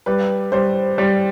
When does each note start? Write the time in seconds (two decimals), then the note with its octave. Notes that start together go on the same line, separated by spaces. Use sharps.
0.06 G3 B4
0.52 G3 C5
0.98 G3 C5